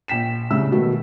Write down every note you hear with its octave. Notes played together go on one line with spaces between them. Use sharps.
A#1 G5 B6 E7
C2 A2 C#3 E5 E6
B2 D#3 F#3 A3 F#4